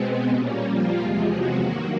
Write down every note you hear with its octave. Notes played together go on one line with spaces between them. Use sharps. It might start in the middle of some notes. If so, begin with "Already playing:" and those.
Already playing: B2 G#3 B3 C4
A#2 G3 A#3 C#4
F3 F4
E2 C3 F3 G#3
F#3 F#4
G2 D#3 F#3 A#3